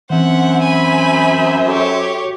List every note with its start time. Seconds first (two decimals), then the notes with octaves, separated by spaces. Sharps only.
0.10 F#2 E3 C4 C5 E5 F#5
0.63 G#5 B5
1.68 F#4 G4 A4 C#5